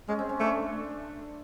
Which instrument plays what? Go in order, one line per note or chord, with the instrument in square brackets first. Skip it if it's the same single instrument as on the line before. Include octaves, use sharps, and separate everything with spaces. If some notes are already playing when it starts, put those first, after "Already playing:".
[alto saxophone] G#3 [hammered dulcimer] C#4
[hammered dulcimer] C4
C#4
[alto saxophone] A3 [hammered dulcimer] D4